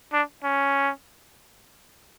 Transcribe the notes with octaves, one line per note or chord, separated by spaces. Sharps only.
D4
C#4